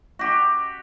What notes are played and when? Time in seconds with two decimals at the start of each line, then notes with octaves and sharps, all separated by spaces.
0.19 F#4 G4